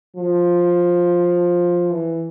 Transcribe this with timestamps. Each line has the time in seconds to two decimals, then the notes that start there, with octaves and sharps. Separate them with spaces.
0.17 F3
1.92 E3